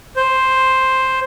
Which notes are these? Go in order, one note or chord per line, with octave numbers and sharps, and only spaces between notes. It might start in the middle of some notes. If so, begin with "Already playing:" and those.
C5